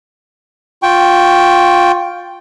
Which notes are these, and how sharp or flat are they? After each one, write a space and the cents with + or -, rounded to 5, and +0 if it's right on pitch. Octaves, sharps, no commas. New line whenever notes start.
F4 +15 G5 +0 C#6 +0